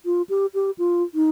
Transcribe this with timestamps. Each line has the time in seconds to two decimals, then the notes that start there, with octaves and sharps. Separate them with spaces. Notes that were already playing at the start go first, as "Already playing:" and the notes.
0.05 F4
0.29 G4
0.54 G4
0.78 F4
1.14 D#4